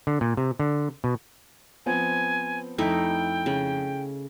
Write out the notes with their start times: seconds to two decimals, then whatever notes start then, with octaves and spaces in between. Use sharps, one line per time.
0.07 D3
0.21 A#2
0.37 C3
0.60 D3
1.04 B2
1.86 F3 B3 C4 G#5
2.78 F2 A3 D#4 E4 G5
3.46 C#3